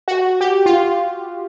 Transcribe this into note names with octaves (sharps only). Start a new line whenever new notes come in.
F#4
G4
F4